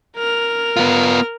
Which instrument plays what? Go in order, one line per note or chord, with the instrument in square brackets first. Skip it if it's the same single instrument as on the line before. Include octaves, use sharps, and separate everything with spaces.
[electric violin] A#4 F6
[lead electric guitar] B3 F4